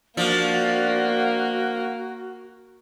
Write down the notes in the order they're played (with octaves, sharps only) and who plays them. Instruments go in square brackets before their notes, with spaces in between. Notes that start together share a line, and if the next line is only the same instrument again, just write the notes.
[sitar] F3 D4 [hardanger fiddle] A#3 [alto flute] F#4